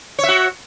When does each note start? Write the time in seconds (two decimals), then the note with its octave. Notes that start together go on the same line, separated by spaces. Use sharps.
0.19 C#5
0.23 E5
0.28 F#4